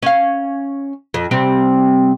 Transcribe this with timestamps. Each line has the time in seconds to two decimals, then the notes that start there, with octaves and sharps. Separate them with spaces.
0.03 C#4 F5
1.14 F2
1.31 C3 G3 C4